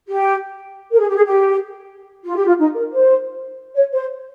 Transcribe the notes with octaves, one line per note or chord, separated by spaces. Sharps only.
G4
A#4
G#4
G4
G#4
G4
F4
G4
F4
D#4
A#4
C5
C#5
C5